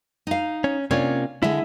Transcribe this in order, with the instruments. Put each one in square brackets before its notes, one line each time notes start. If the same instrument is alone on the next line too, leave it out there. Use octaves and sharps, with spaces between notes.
[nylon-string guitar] D#4 F5
[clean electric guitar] C#4
[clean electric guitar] C3 A#3 F4 [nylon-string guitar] C#4 D4 C#5
[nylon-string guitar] D3 G#3 [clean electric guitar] E4 E5